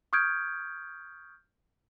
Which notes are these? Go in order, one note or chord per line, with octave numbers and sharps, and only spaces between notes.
C#6 D#6 F6 G6 G#6 D7